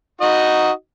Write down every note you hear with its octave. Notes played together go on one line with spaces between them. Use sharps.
D#4 F#4 D#5